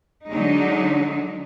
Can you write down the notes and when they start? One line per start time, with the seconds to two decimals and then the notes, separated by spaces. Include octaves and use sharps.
0.28 D3 F#3 G#3 D4 D#4